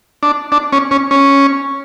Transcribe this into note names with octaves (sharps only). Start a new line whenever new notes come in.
D4
D4
C#4
C#4
C#4